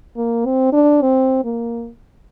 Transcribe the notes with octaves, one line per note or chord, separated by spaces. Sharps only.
A#3
C4
D4
C4
A#3